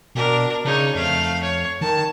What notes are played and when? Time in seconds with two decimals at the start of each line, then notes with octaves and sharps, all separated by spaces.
0.15 B2 D4 A#4
0.65 C#3 D#4 C#5
0.95 F2 A3 F5
1.43 C#5
1.81 D#3 A5